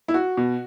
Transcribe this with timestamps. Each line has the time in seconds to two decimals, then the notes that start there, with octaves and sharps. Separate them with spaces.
0.08 E4
0.14 F#4
0.37 B2